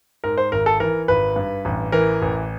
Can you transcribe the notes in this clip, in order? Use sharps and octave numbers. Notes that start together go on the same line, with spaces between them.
G#2 A#4
C5
G#1 A#4
A4
E3 A#4
G#1 B4
G2
A1
E3 A#4
A1